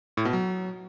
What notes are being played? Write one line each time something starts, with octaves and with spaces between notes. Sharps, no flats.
A2
B2
F#3